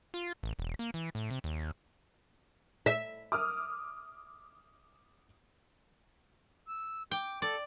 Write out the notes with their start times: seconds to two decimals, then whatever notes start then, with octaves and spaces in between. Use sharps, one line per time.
0.14 F4
0.43 A1
0.59 E1
0.79 A#3
0.94 E3
1.15 A2
1.31 C3
1.44 D#2
2.86 E5
3.32 D6 D#6 F6
6.67 E6
7.11 G5 D6
7.42 A4 D5